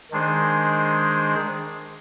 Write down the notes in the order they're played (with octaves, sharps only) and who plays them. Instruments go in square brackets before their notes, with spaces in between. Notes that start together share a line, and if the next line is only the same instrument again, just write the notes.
[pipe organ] D#3 G#3 D4 G#4 C5